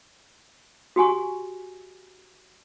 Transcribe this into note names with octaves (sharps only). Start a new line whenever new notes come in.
F#4 G4 G#5 C#6